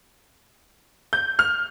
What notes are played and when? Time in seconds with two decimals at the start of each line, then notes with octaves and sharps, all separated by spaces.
1.13 G6
1.39 F6